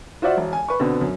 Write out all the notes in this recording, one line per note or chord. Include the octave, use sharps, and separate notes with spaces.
F4 F#4 C5 D5 E5 F#5
E1
G#5
B4 C#6
B2 D3 B3 C4
F#2